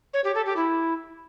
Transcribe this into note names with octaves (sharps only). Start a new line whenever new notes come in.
C#5
G4
A4
G4
E4